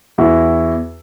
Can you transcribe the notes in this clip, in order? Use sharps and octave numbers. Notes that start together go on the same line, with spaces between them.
E2 E4 F#4